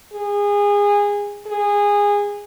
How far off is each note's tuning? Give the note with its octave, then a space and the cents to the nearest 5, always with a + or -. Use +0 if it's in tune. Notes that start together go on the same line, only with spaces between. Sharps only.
G#4 -25
G#4 -20